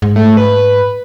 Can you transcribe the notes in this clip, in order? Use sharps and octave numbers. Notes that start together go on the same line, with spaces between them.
G#2
A3
B4